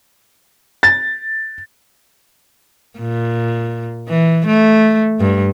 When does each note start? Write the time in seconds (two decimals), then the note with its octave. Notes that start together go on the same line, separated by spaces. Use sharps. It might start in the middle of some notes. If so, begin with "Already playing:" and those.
0.83 A6
2.99 A#2
4.08 E3
4.47 A3
5.20 G2